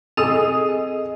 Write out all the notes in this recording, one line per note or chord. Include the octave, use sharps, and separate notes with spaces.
C4 G#4 A4 D#5 D#6